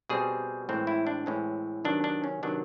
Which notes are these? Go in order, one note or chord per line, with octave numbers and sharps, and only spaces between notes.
B2 G3 C4 G#4
A2 E3 G#3 C4
E4
D4
A2 E3 G#3 C4 C#4
C3 D#3 F#3 B3 D4
D4
C#4
C3 D#3 F#3 B3 D4